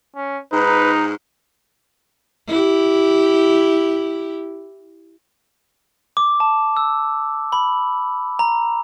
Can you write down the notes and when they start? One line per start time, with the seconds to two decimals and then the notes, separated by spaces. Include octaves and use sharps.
0.16 C#4
0.53 G#2 D#4 B4
2.48 E4 G4
6.17 D6
6.40 A5
6.77 E6
7.52 B5
8.39 A#5